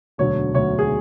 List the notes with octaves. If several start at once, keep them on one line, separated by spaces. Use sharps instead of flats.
E1 D2 D3 F#3 C#5
E1 D2 D3 F#3 C#5
G#4